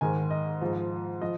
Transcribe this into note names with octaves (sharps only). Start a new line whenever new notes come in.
G#2 D#3 G#5
D#5
G#2 F3
F3 D#5